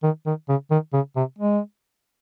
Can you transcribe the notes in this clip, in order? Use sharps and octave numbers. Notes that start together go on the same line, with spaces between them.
D#3
D#3
C#3
D#3
C#3
C3
G#3